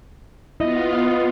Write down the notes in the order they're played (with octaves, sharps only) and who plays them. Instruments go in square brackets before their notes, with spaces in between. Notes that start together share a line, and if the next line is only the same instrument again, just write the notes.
[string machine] B3 F4 [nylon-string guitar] E4 [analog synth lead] D#5